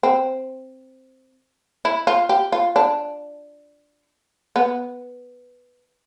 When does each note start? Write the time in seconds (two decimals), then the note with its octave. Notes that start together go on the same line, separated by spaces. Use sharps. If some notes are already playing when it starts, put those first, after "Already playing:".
0.03 C4
1.85 E4
2.07 F4
2.29 G4
2.52 F4
2.76 D4
4.56 B3